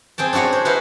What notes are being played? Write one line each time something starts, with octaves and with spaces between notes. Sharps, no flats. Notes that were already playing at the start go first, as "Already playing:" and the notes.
C4 G#4 G5 A5
D4 E4 F#4 G#4 C#5
C5
E4 B4 C5 D#5 F5 F#5